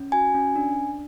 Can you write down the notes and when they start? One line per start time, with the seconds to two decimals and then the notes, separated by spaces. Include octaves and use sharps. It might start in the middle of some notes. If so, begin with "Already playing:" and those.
Already playing: C#4
0.12 F#4 G#5
0.35 C#4
0.56 D4
0.77 D4